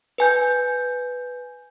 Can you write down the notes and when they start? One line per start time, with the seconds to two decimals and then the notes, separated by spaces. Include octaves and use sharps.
0.18 B4 G#5 G6